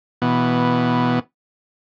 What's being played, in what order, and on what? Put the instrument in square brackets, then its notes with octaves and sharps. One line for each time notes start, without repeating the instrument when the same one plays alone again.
[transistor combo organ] B2 E3 B3